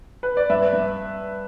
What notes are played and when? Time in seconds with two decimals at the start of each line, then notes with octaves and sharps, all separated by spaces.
0.23 B4
0.37 D5
0.50 G2 B4 E5
0.73 G2